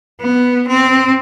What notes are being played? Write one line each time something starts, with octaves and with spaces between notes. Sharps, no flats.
B3
C4